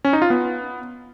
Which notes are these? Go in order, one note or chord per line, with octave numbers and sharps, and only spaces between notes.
C#4
D#4
F4
B3